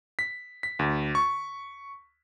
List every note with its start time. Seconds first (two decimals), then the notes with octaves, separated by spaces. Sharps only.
0.19 B6
0.63 B6
0.79 D2
1.15 C#6